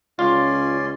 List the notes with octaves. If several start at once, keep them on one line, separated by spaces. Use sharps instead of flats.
C#2 C#4 F4 D5 C6